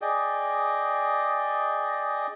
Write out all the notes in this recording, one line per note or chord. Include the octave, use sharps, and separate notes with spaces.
G#4 D5 D#5 G5